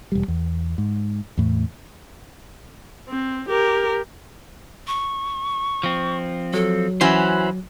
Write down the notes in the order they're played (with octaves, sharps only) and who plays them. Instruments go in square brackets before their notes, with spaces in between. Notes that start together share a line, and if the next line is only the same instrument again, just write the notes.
[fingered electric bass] E1 G3
E2
G#2
E2 A2
[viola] C4
G4 A#4
[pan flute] C#6
[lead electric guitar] F3 C4
[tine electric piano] F#3 [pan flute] A4
[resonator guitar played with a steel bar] E3 C#4 F#4 [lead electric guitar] C5 E5 [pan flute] B5